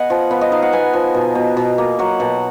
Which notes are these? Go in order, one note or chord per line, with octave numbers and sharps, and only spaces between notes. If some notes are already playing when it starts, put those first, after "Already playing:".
Already playing: B3 D#5 F#5 G#5
F3
B3 F5
D#5
D#4 F5
F#5
B3 G#5
F3
B2
B2
B2
A#3
F#3 F#5
B2 F#5